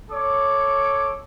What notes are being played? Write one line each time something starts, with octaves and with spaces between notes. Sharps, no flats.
A4 C#5 D6